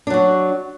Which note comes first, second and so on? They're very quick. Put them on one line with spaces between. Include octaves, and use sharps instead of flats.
D4 F#3 F#4